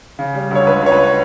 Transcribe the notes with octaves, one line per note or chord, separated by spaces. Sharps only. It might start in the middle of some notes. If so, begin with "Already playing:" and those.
C#3
G3
D2 C#5
C#2 B4
C#2 C#5
B4